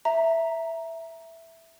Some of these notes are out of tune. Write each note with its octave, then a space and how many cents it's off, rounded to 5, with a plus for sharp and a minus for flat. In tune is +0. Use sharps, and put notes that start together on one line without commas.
E5 +0 A#5 +0